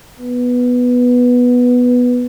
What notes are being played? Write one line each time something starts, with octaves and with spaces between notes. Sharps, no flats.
B3